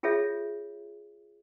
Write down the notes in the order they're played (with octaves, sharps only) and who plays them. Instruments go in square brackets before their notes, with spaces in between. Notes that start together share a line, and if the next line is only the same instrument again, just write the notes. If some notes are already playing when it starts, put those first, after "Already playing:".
[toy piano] F4 G#4 A4 C#5 E5